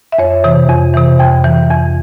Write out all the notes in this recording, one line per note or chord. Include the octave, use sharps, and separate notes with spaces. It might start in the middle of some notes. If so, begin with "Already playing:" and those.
E5
F2 C#5
C3 E3
F2
C3 E3
F2 G5
E3
F2